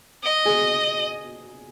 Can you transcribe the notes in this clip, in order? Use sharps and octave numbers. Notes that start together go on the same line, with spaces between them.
D#5
G#4